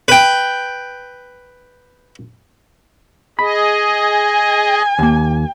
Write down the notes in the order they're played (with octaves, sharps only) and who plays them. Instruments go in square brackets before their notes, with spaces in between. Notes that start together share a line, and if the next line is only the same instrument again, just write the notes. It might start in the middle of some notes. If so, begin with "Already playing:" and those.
[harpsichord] B4 G5
[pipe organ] G#4 D#5 [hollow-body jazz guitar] B5
[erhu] G#5
[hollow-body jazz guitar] D#2 A#3